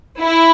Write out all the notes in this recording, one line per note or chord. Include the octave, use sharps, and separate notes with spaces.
E4